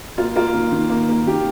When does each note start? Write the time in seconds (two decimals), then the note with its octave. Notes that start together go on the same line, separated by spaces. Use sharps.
0.18 A#3 F4
0.36 A#3 F4
0.54 D#3
0.72 D#3
0.90 A#3
1.09 A#3
1.27 D#3 G4